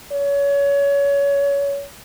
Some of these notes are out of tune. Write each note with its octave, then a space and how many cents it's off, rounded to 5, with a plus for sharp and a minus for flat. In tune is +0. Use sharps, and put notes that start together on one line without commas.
C#5 +25